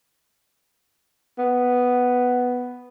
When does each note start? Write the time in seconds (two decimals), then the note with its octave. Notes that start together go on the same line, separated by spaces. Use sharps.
1.38 B3